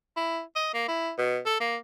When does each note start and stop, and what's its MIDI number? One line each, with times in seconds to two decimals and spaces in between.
0.16 0.41 64
0.56 0.71 75
0.74 0.87 58
0.88 1.10 64
1.18 1.39 47
1.46 1.59 69
1.60 1.76 58